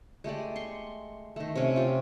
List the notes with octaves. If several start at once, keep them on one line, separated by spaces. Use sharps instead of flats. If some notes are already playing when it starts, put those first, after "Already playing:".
G#3 A3 G4 D5
C6 C#6
D#3 A3
C3 C#4
F4 G4